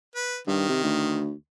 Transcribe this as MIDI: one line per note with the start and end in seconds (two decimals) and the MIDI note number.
0.16 0.37 71
0.47 0.65 43
0.47 1.24 51
0.69 0.79 48
0.83 1.32 38